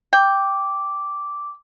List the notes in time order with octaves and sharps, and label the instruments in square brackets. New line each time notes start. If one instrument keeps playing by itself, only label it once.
[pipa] G5 [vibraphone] D6